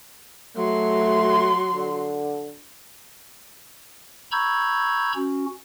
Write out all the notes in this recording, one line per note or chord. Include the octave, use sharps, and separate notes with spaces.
F#3 A3 C6
D3
A#5 B5 C#6 E6 G6 G#6
C#4 F#4